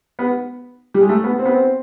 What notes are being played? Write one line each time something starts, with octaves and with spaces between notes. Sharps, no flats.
B3
G3
G#3
A3
B3
C4
B3
C4